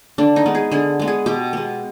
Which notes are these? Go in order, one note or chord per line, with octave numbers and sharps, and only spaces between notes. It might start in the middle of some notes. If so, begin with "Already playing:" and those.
D3 D4
D#4
G#3 B3
G#4
D3 G#4
G#3 B3
G#4
B2 G4
G#3 B3